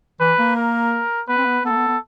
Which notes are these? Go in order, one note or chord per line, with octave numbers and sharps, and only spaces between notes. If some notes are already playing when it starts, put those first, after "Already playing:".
E3 B4
A#3
A#4
B3 B4
C4
B3
B3 A4
A#3
B3
B3